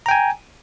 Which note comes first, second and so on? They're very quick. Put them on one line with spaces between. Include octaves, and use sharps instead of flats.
A#5 G5 G#5